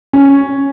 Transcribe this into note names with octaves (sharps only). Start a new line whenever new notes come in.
C#4